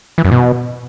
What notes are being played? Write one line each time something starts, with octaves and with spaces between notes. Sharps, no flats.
E3
F#2
B2